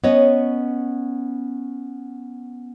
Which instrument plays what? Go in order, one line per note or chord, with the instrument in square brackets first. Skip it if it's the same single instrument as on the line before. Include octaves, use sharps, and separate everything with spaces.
[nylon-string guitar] B3 C#4 C#5 D#5